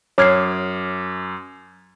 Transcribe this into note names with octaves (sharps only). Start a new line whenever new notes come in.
F#2 C#5 D6 F6 G#6 C7